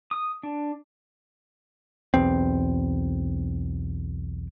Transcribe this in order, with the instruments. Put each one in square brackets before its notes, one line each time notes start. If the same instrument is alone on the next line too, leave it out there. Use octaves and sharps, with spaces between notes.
[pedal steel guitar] D#6
D4
[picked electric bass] B1 E2 C4